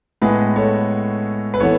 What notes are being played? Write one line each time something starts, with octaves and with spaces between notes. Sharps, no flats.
A2 G#3 B3 G#4 B4
A4 C#5
B4
E3 B3 A4 C#5